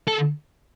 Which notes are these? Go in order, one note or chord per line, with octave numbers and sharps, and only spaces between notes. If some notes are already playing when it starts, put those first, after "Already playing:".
A4